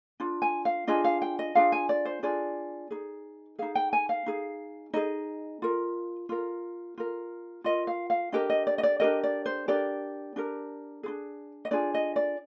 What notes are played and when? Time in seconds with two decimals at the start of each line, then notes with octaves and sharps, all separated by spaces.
0.20 D4 F4
0.42 G#5
0.65 F5
0.87 D4 F4 G#4 D#5
1.04 F5
1.22 G5
1.39 D#5
1.55 D4 F4 G#4 F5
1.72 G#5
1.89 D5
2.05 C5
2.23 D4 F4 G#4 D5
2.91 D#4 G#4
3.59 D#4 G#4 F5
3.75 G5
3.93 G#5
4.09 F5
4.26 D#4 G#4
4.93 D#4 G#4 D#5
5.62 F4 A#4
6.29 F4 A#4
6.98 F4 A#4
7.64 F4 A#4 D#5
7.87 F5
8.10 F5
8.32 D4 G4 A#4 D#5
8.50 D#5
8.67 D5
8.78 D#5
8.83 D5
9.00 D4 G4 A#4 D#5
9.23 D5
9.46 C5
9.68 D4 G4 A#4 D5
10.36 D4 G4 A#4
11.03 D4 F4 G#4
11.65 D#5
11.71 D4 F4 G#4 D5
11.94 D#5
12.16 D5